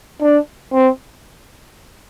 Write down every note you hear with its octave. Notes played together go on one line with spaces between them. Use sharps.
D4
C4